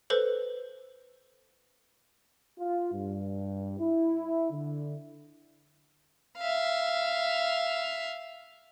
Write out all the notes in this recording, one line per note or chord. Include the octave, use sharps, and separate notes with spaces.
A4 B4 C5
F4
G2
E4
D3
E5 F5